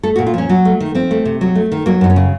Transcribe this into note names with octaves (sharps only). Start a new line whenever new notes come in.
A3 A4
F#4
A#2
F4
F3 C#4
F#3
A3
D#3
F3 C4
A3
C3
F#3
A3
D#3
F#3 A#3
F#2 D#4
C#4
C#3